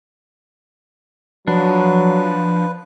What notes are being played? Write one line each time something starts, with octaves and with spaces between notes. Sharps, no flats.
F3 F#3 D4 B4